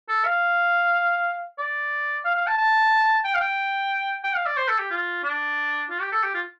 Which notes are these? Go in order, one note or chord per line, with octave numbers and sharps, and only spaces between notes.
A4
F5
D5
F5
F5
A5
A5
G5
F5
G5
G5
F5
D5
C5
A4
G4
F4
D4
F4
G4
A4
G4
F4